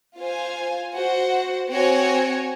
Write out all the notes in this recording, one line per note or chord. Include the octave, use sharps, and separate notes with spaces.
F4 C5 F5 G#5
F#4 C5 F#5
C4 F#4 C#5 G#5